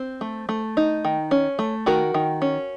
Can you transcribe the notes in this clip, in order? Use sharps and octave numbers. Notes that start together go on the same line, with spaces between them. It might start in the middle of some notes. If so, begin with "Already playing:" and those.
Already playing: C4
A3
A3
D#4
D#3
C#4
A3
D#3 F#4 A#4
D#3
C#4